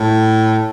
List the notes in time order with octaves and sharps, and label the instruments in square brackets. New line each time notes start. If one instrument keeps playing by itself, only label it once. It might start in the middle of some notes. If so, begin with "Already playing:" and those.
Already playing: [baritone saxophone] A2